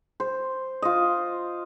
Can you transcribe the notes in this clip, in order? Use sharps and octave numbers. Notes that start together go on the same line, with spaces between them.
C5
F4 D#5